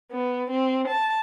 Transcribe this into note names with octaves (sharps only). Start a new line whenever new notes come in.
B3
C4
A5